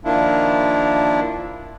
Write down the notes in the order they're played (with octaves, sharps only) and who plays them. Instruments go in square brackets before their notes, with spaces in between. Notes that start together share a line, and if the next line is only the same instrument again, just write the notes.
[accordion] D#3 F3 A#3 D4 E4 F4